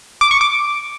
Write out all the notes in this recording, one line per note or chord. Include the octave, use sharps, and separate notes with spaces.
D6
C#6
D6